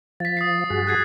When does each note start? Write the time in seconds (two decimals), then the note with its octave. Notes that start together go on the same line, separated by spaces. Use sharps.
0.20 F3 A6 B6
0.37 D#6 A6 C7
0.70 G2 F#4 G#4
0.87 F#6 G#6 C7